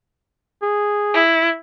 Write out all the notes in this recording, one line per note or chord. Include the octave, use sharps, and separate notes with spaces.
G#4
E4